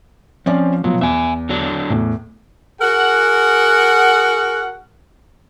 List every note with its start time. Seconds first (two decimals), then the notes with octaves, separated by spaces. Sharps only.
0.46 F3 C4 C#4 D5
0.84 B2 F3 F#3
1.01 E2 E5 G#5
1.49 D3 F#3 D4
1.90 E2 A2
2.81 F#4 G#4 A#4 F#5